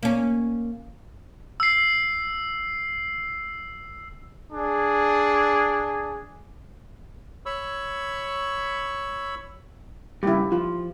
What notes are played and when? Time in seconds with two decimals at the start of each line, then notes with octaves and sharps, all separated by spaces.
0.03 A#3 C#4
1.60 E6 C7
4.53 D4 G#4
7.46 C#5 B5 C#6 E6
10.23 G2 A#2 C#3 E4 G4
10.52 F3 F4